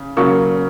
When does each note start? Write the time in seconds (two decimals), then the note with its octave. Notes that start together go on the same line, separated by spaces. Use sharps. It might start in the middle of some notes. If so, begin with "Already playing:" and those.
Already playing: C#3
0.17 C#3 F#3 A#3 C#6